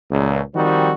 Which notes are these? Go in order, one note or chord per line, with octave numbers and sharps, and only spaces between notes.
C#2 A#2
D#3 F3 G3 C4 D#4 F#4